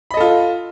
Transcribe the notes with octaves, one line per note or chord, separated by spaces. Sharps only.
F4 A4 D#5 B5